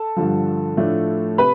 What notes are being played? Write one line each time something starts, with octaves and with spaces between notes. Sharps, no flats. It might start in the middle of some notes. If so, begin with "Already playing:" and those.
Already playing: A4 A5
G2 D3 F3
A2 F3 A3 D4
C3 B4 B5